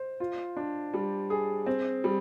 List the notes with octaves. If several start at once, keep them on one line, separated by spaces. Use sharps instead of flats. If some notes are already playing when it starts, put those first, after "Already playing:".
Already playing: C5
F4
D4
G3
G#4
C4
G3